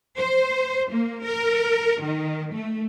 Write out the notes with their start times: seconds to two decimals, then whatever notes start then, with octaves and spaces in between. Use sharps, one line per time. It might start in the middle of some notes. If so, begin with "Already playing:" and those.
0.17 C5
0.92 A#3
1.24 A#4
2.01 D#3
2.53 A3